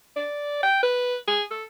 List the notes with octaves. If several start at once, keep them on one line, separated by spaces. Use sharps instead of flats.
D5
G5
B4
G#4
A4